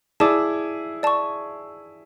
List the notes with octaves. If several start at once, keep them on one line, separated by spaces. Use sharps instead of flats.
E4 G#4 D5 A5 D6
D5 A5 C#6